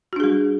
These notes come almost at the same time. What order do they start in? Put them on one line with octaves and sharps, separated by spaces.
F#4 D4 G#4 G3